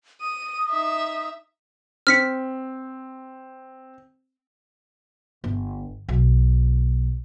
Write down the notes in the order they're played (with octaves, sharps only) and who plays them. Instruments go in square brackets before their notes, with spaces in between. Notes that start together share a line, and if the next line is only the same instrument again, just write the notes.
[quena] D#6 [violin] D#7
[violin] D#4 E5
[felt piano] C4 [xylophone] F6 B6 C#7
[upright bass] G1
B1